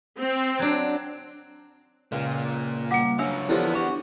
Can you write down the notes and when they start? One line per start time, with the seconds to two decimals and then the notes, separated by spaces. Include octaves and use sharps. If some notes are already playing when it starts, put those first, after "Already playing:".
0.20 C4
0.59 F#3 D4
2.12 C#2 A#2
2.91 G3 A#3 F#5 D6
3.19 F#3 D4 C#5 E5 F5 E6
3.49 E2 D3 F3 B3 E4 G4
3.75 D4 F#4